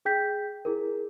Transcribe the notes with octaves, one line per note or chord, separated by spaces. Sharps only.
G#4 G5 G6 B6
E4 G#4 A#4